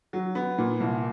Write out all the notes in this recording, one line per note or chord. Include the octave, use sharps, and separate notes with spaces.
F#3
B3
A#2
C2